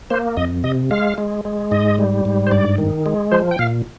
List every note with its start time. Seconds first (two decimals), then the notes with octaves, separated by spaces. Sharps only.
0.10 A#3 C5
0.37 F2 D#5
0.64 C3 D#5
0.91 G#3 F5
1.18 G#3
1.45 G#3
1.71 G#2 D#5
1.99 G3
2.25 G#2
2.47 C5
2.51 G2 D5
2.78 D#3
3.06 G#3
3.32 F3 C5
3.51 G5
3.59 A#2 F5